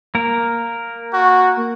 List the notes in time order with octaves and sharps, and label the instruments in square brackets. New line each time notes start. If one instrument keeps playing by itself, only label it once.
[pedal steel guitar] A#3 A#4
[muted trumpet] F#4